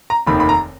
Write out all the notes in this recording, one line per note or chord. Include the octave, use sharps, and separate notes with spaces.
A#5
F1 D#2 D#3 B5
B5
A#5